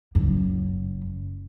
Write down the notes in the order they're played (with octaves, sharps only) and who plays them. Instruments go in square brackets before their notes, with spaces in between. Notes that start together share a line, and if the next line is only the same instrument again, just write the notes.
[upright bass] F#1 F#2